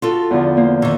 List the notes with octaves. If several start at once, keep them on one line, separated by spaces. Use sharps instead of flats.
F4 F#4 A4
E2 D3 F3
A#3 C5
D#3 E3